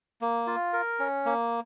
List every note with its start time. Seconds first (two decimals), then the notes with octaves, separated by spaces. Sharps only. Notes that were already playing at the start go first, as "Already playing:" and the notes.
0.21 A#3
0.47 F4
0.73 A#4
0.99 C#4
1.26 A#3